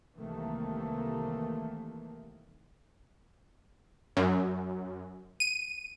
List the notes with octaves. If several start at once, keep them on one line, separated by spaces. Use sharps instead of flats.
C2 C3 D#3 E3 A3 A#3
F#2
D#7